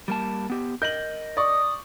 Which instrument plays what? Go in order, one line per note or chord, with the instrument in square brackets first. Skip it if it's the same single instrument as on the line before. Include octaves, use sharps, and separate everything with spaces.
[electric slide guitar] G3 A#3 A5
B3 G4
[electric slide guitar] A#4 D#5 [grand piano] G6 F#7
[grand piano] D5 C#6 [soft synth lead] D#6